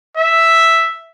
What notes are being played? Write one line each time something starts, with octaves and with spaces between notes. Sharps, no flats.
E5